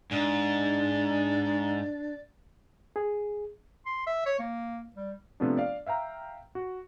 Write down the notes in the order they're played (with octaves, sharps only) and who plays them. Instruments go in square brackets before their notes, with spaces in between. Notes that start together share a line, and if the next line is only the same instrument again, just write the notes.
[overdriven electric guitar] G#2 [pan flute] D4 [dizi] D5
[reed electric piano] G#4
[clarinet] C6
E5
C#5
A#3
G3
[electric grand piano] C3 F3 A3 B3 D4
D5 F5
E5 F5 G5 A#5
F#4